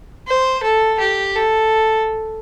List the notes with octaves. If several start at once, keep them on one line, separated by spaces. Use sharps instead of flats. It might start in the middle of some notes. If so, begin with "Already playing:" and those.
C5
A4
G4
A4